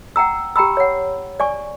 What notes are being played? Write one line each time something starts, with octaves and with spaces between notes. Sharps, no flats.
F#5 G5 A#5 E6
G4 G5 A#5 B5 E6
C#5 F#5
D5 G#5 C#6